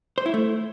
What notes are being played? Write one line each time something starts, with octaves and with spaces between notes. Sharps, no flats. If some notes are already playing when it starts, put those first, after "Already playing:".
C5
E4
A3